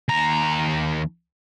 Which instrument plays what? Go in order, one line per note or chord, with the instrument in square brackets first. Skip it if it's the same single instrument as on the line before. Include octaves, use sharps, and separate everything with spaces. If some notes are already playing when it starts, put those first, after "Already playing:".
[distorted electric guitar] D#2 A#5